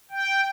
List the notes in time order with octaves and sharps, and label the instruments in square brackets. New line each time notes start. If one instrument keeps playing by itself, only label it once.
[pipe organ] G5